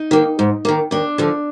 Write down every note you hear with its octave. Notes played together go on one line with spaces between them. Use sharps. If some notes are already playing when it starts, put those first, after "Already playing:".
Already playing: D#4
D#3 A#3
G#2
D#3 A#3
D#2 D4
D3 F3